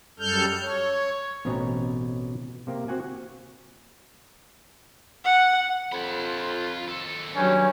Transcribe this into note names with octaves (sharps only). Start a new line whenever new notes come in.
F#2 G3 A4 F6 G6
C#5
A1 B2 C4 C#4 D#5 A#5
C3 A#3 G4
C4 F#4 F#5 G#5
F#5
F2 F4 B5
D#2 A4
G2 F#3 C#4